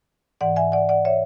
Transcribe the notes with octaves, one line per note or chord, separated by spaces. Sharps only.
G#2 E3 D5 F#5
E5 G#5
D5 F#5
D5 F#5
C#5 E5